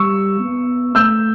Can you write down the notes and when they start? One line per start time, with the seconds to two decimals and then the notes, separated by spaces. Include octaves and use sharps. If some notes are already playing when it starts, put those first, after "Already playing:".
Already playing: G3 C#6 E6
0.40 B3
0.95 A3 E6 G6